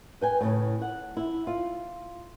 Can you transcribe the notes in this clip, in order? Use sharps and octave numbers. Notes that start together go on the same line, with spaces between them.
B4 G5 G#5
A2 C#3
F#5
E4
F4